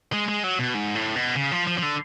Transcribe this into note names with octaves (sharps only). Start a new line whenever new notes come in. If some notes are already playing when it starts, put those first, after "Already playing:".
G#3
G#3
F#3
B2
G#2
A2
B2
C#3
F3
F3
F3
D3